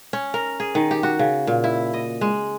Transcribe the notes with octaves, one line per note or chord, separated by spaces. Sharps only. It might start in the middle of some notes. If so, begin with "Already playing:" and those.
C#4
A#4
G#4
D#3
G4
F#4
C#3
A#2
E4
D#5
G#3